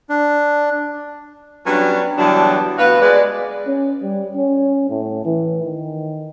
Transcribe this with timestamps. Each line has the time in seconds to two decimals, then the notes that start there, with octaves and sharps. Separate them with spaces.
0.09 D4
1.66 F#3 G3 B3 C#4 D4
2.18 D3 E3 F#3 G3 B3 D4
2.78 D2 B3 F#4 B4 F5
3.02 G#3 B4 D5
3.67 C#4
4.02 G3
4.36 C#4
4.89 A2
5.25 E3
5.63 D#3